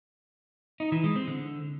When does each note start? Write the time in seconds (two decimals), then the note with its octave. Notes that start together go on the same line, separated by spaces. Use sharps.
0.80 D#4
0.92 E3
1.04 G#3
1.16 C4
1.28 D3